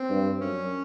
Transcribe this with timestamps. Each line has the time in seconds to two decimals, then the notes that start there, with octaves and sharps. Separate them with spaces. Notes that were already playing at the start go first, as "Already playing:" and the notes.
Already playing: C4
0.10 G2
0.40 F#2 C#4